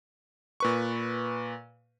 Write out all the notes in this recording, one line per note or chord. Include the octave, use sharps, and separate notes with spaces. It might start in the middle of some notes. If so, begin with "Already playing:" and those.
A#2 B4 C#6